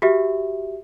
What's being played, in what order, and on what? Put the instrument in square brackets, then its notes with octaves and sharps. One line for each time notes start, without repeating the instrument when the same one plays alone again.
[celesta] F#4 G4 E5